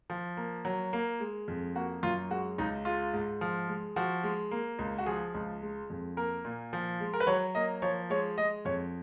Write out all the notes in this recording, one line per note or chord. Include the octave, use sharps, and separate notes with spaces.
F3
A#3
F#3
A#3
G#3
F2
A#3 F#4
F#2 F4
G#3 F#4
C#2 D#4
G#3 F4
G#2
F3
G#3
F3 F#4
G#3
A#3
C#2
F#4
F3 G#4
C#2
G#3
F2
A#3 A#4
A#2
F3
G#3
A#4
B4
F#3 C#5
A#3 D#5
F3 C#5
G#3 C#5
G#3 D#5
F2 C#5